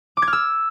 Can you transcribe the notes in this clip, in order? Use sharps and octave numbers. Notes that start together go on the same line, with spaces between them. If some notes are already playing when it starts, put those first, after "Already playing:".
D6
G#6
F6
E6